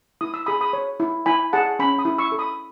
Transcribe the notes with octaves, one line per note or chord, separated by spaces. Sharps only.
E4 D#6
E6
G#4 B5 D#6
B5 D#6
C#5
E4
E4 G#5 B5
G#4 F#5 A5
C#4 G#5 B5
B5 D#6
E4
C#6 E6
A4
B5 D#6